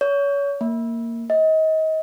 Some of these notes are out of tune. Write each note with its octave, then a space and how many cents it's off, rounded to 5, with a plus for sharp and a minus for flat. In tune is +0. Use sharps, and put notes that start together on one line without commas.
C#5 +30
A#3 -10
D#5 +30